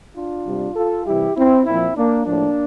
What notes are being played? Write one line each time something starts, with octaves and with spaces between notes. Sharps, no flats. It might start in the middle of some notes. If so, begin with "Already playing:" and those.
D4 F4
C3 G3
F4 A4
C3 E3 G3 E4 G4
C4 E4
A#2 F3 C4 E4
A#3 D4
A2 F3 A#3 D4